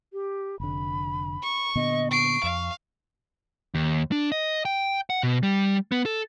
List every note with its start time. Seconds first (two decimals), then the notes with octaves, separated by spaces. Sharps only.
0.13 G4
0.60 F1 D3 B5
1.42 C#6
1.75 A#2 D3 B3 D#5
2.11 C#6 C7 D7
2.43 F2 F5
3.75 D#2
4.12 D4
4.32 D#5
4.65 G5
5.10 F#5
5.23 B2
5.43 G3
5.92 B3
6.06 A4